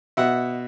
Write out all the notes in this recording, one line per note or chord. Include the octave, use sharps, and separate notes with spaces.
B2 E5 F#5